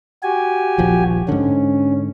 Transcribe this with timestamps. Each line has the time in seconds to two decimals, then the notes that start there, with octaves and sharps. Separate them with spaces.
0.23 F#4 G4 G#5
0.78 D#1 A#1 F3
1.28 G#2 D3 C#4